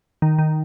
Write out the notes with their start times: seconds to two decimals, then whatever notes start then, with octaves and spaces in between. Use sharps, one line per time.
0.22 D#3
0.39 D#3